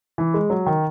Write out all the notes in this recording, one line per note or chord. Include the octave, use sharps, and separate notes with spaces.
E3
G#3
F#3
D#3